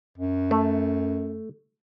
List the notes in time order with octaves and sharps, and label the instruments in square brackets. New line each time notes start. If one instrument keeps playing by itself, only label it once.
[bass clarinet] F#2
[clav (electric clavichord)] A3